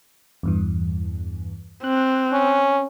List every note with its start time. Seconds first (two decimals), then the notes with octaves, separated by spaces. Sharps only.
0.43 E2 G2 E3
1.84 C4 F#6
2.33 C#4